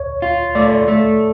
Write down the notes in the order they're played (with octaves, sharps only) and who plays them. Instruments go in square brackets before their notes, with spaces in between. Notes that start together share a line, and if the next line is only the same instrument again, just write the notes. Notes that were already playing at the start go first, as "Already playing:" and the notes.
Already playing: [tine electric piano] C#5
[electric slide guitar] F4
[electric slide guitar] A3 [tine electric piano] D5
[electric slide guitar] A3